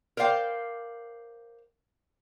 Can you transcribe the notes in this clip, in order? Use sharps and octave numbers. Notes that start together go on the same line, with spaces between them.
A#4 C5 D5 F5 G5